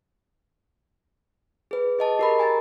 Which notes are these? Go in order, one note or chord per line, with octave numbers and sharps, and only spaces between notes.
G#4 B4
G#4 D#5 A5
G4 A#4 B5
G#5 A#5 A6